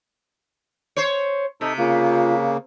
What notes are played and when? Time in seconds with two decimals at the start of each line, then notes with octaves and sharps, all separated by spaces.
0.96 C5 C#5
1.61 C3 D#4 A4
1.78 C#3 A#3 F4